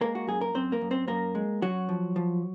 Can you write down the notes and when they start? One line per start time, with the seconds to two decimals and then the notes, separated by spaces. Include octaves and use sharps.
0.01 G#3 A#3 A#4
0.15 F#4
0.27 F#2 G#4
0.41 A#4
0.54 F#2 C4 C5
0.72 A#3 A#4
0.81 F#2
0.91 C4 C5
1.08 F#2 A#3 A#4
1.35 G#3
1.62 F#2 F#3 F#4
1.89 F3
2.16 F3